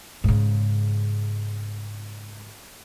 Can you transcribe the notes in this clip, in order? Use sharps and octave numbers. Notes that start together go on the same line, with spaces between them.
G#2 C#3